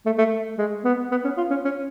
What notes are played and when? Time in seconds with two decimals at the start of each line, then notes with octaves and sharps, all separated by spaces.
0.06 A3
0.18 A3
0.58 G#3
0.84 B3
1.11 B3
1.25 C#4
1.37 F4
1.50 C#4
1.65 C#4